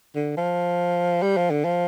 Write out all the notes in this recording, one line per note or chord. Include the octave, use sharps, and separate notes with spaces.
D3
F3
G3
F3
D3
F3